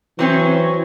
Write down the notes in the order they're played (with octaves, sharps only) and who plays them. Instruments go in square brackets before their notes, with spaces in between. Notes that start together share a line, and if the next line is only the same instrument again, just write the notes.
[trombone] E3 [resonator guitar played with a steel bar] F#3 C4 C#4